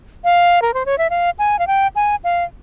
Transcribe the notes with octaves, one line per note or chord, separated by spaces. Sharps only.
F5
A#4
C5
C#5
E5
F5
G#5
F5
G5
G#5
F5